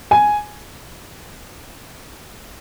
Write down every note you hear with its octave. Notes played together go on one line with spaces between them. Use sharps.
G#5